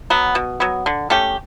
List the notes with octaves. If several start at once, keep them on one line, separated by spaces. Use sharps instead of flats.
F#3 B3
B2
F#3 B3
D3
A3 C#4 G4